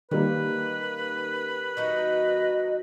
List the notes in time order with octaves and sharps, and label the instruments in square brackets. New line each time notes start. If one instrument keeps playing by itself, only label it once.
[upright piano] D#3 G3 A#3 [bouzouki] C#4 [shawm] B4
[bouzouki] F#3 D#4 F#4 [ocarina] D#5